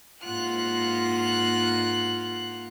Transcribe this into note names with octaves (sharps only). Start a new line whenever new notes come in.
G#2 A#3 F4 F#5 F#6